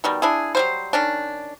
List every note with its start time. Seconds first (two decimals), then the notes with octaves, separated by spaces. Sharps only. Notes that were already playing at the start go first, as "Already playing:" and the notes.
0.04 B2 D#3 G3
0.22 D4 E4 G#4
0.55 F#3 G3 C5
0.93 D#3 C#4 D4